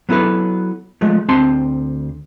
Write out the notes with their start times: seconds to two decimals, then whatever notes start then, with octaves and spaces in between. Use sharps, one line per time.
0.09 F#3 B3 E4 A4 B4
1.01 F3 G#3 A3
1.28 D2 C4 A5 C6